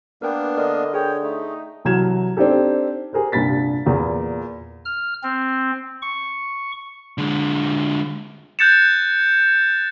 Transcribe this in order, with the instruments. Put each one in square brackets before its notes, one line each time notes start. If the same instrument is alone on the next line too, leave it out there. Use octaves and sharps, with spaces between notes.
[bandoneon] A#3 B3 D4 [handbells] A#4 B4 G5
[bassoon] D3 [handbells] A#4 [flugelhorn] D#5
[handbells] G#4 [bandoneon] C#5 [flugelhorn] G5
[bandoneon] A3 [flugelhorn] D#4
[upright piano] C2 E3 F#3 F6 G#6 E7
C4 D4 D#4 G4 A4
G4 G#4 A#4 C5
C2 G2 A#2 B5 A6 B6
E2 A#2 A#3
[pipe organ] F6
C4
C#6
[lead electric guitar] D3 G#3
[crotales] F#6 G6 A6 C#7 E7